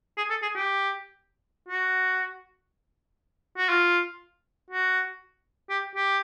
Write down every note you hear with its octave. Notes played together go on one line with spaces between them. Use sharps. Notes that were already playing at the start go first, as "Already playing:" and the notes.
G#4
A4
G#4
G4
F#4
F#4
F4
F#4
G4
G4